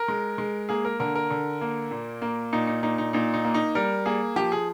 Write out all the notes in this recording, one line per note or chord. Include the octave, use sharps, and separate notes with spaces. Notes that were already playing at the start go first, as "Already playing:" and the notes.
Already playing: A#4
G#3
G#3
A#3 G#4
A#4
D3 A#4
A#4
D3
A#3
A#2
A#3
A#2 D#4
D#4
A#2 D#4
D#4
A#2 D#4
D#4
A#3
D#4
G3 A#4
A#3 G#4
F3 G4
G#4